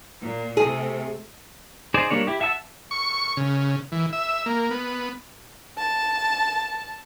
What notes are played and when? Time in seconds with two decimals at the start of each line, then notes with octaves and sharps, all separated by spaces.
0.21 A#2
0.57 C3 A3 G#4
1.94 D#4 G#4 C5 D5
2.10 G3 A#3 D4 C#5
2.27 E4 G4
2.41 E5 F#5 A5 E6
2.91 C#6
3.37 C#3
3.92 E3
4.13 E5
4.46 A#3
4.71 B3
5.77 A5